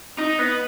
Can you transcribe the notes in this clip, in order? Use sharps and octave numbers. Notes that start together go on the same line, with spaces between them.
D#4
B3